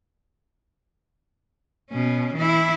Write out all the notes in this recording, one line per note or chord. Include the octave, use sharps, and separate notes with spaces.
B2 C#4
E3 E4